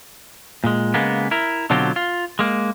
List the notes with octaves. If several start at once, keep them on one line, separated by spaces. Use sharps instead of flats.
A#2 G#3
C#3 G#3 A#3 B3
E4 A#4
B2 D3 F#3 C4 F4 G4
F4
G#3 A#3